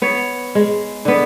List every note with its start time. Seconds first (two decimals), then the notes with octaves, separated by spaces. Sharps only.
0.02 B3 C#5
0.55 G#3
1.05 D3 B3